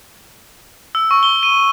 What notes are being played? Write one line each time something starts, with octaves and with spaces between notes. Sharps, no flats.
E6
C#6
G7
D#7